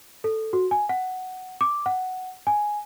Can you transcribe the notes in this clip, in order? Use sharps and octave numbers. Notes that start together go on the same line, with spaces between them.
A4
F#4
G#5
F#5
D6
F#5
G#5